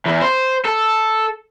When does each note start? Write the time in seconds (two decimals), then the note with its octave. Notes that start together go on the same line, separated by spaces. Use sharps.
0.06 E2
0.22 C5
0.65 A4